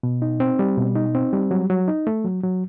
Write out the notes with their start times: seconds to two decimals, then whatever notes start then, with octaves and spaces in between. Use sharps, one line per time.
0.03 B2
0.22 D#4
0.40 C4
0.59 G3
0.77 B2
0.96 D#4
1.15 C4
1.33 G3
1.51 F#3
1.70 F#3
1.88 D#4
2.07 A3
2.25 F#3
2.43 F#3